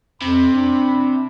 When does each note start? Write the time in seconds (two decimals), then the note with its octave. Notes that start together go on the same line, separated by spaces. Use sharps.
0.21 F2 C3 B5
0.54 D4